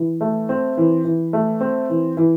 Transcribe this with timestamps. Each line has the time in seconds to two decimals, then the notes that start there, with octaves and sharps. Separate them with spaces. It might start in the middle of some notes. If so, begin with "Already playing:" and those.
Already playing: E3
0.21 A3
0.49 C4
0.77 E3
1.05 E3
1.33 A3
1.61 C4
1.90 E3
2.17 E3